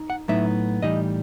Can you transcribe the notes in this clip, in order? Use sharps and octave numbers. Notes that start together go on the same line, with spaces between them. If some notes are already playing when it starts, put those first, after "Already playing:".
Already playing: D#4
F#5
A2 F#3 B3 D#4 E5
A2 E3 G3 D#4 D#5